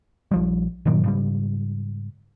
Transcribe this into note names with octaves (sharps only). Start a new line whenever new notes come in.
A#1 F3 G3
G2 A#2 D#3 F#3
G#2 C#3 G3